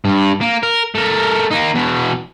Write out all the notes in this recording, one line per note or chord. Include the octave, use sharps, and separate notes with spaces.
G2
A#3
A#4
A3 A#4
A#3 D#4
E2 B2